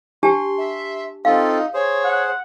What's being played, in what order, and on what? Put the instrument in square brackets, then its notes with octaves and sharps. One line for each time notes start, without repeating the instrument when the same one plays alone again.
[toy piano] D4 G4 A5 [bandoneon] C6
[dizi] E5
[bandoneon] C4 F4 A4 [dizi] D#4 [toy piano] F5
[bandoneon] G#4 C5 [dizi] C#5
[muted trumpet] F#5